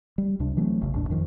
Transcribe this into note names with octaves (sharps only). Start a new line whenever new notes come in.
G3
C#2 C3 D4
E3 F#3 A3 C4
F1 B1 C#3
G1 D#2 A2 D4
F2 D#3 F3